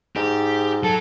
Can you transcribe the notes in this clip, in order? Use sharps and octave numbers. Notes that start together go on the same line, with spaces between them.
G#2 G4
F#3 A4